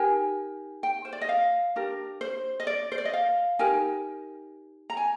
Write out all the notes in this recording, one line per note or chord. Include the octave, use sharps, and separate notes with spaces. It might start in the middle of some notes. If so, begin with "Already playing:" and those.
Already playing: D#4 G4 A#4 G#5
G5
C5
D5
D#5
F5
D4 G4 A#4
C5
D#5
D5
C5
D5
D#5
F5
D#4 G4 A#4 G#5
A#5
G#5